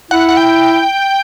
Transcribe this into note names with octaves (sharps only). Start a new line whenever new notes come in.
E4 F#5
F#5
G5